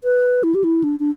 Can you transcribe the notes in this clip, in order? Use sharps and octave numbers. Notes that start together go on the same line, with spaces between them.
B4
E4
G4
E4
D4
D4